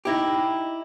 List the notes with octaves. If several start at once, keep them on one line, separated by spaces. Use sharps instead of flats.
D#4 E4 G4